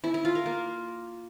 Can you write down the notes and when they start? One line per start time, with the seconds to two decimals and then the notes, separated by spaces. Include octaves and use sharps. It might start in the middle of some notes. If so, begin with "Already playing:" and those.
0.04 E4
0.14 E4
0.25 F4
0.35 A#4
0.46 A#3